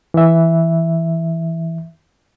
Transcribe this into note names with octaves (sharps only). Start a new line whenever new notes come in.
E3 E5